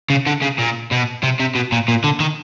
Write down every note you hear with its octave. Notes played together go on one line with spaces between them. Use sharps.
C#3
D3
C#3
A#2
B2
C3
C3
B2
A#2
A#2
D3
D#3